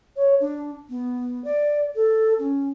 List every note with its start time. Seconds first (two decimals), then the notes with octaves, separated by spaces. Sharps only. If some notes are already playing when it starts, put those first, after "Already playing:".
0.16 C#5
0.40 D4
0.89 B3
1.44 D5
1.95 A4
2.39 C#4